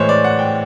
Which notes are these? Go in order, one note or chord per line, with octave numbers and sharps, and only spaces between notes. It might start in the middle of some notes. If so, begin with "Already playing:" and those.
Already playing: A2 E3 G#3 C5 C#5
D5
F#5
G5